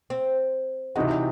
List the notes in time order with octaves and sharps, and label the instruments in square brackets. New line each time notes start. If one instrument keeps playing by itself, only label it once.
[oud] C4
[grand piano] C3 E3 C4 D#4 F#4 [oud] G#3
[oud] F#3